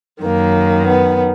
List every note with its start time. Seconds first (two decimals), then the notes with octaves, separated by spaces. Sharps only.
0.23 F#2 D#3 A#3
0.86 B3